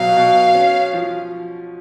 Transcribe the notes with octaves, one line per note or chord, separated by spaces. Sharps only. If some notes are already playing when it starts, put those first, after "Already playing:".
Already playing: B2 F#3 F5
B2
C#4
F3